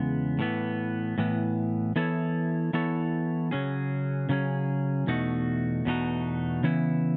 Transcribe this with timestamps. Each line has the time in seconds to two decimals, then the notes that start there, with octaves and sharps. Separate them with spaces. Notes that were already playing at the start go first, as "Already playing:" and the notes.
Already playing: E2 C#3 G#3 B3
0.39 A2 E3 B3
1.18 A2 E3 B3
1.96 E3 B3 E4 A4 C#5
2.73 E3 B3 E4 A4 C#5
3.51 C#3 F#3 C#4 G#4
4.29 C#3 F#3 C#4 G#4
5.07 E2 B2 A3 D#4 F#4
5.85 E2 B2 A3 D#4 F#4
6.63 C#3 E3 B3 E4